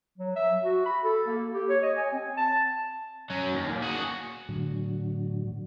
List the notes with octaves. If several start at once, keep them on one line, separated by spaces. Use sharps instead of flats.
F#3
E5
F#4
B5
A4
A#3
G4
C#5
D#5
G#5
C4
A5
F#3 C#4
D#2
A#2
F#4 G#4
A2 D3 F#3